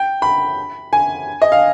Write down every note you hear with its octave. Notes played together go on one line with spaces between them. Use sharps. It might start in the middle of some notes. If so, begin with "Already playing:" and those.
Already playing: G5
B5
G#5
D#5
F5